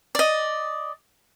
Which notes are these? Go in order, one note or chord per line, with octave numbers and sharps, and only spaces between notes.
D5 D#5